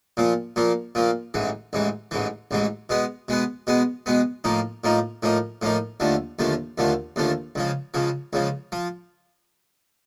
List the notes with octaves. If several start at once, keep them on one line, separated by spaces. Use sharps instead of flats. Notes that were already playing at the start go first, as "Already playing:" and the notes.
A#2 F3 A#3
A#2 F3 A#3
A#2 F3 A#3
A1 G#2 E3
A1 G#2 E3
A1 G#2 E3
A1 G#2 E3
B2 G#3 B3
B2 G#3 B3
B2 G#3 B3
B2 G#3 B3
A2 F3 A#3 D#4
A2 F3 A#3 D#4
A2 F3 A#3 D#4
A2 F3 A#3 D#4
D#2 D3 F3 A3
D#2 D3 F3 A3
D#2 D3 F3 A3
D#2 D3 F3 A3
C#2 C#3 F3
C#2 C#3 F3
C#2 C#3 F3
F3